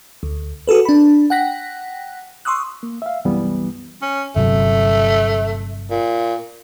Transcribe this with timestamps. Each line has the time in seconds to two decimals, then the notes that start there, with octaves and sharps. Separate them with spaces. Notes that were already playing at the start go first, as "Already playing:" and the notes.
0.23 D2
0.67 F#4 G#4 A4 B4
0.85 D4 B5
1.30 F#5 G5 F#6 A#6 B6
2.45 C6 C#6 D#6 E6 F#6
2.83 A#3
3.02 E5 F5
3.25 C2 F#2 E3 G3 B3
4.02 C#4
4.36 G1 C3 F#3 A3
5.90 A#2